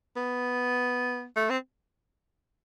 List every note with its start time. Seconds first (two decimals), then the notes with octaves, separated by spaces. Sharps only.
0.16 B3
1.36 A3
1.50 C4